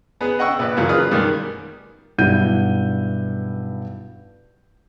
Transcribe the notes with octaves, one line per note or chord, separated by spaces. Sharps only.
B3 G#4 B4
D#5 F#5 G5 C#6 E6
A#1 B4
F#2 A#2 C#3 E3 F#3
F4 G#4 B4 D#6 F6
F#2 B2 D#3 G3 B3
B1 G2 E4 F#5 G6 D#7